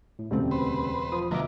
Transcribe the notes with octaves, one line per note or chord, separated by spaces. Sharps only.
A2
E1 D2 C#3 G3 A3 C4
B4 C5
F3 D#6
D2 B2 F3 F#3 E5 A#5 D6